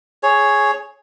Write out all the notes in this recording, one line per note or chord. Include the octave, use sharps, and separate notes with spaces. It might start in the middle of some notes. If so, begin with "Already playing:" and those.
G#4 C#5